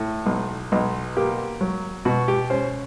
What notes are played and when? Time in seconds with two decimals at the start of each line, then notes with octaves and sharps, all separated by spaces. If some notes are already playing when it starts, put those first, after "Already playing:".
Already playing: A2
0.26 B1
0.72 B1
1.17 A#3 G4
1.61 F#3
2.05 B2 F#4
2.28 G4
2.50 C#4 C5